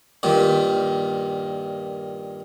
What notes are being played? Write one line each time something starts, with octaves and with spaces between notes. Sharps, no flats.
G2 A#2 D#3